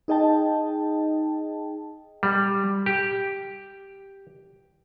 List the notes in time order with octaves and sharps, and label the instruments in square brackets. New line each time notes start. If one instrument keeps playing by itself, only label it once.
[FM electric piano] D#4 G#4 D#5 G5 A5
[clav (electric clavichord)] G3
G4